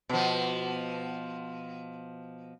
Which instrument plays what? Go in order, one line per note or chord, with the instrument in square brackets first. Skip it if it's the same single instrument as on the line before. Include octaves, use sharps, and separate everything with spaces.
[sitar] B2 F3